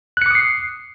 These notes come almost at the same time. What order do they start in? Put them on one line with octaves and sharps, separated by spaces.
F#6 C#7 D6 D#6 C7